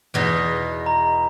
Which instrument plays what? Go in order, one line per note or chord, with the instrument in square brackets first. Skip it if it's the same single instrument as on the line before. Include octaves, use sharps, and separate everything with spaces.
[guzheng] E2 B2 D#4
[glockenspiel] A#5